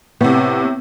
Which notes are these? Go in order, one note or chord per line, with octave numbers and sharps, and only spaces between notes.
A2 C3 B3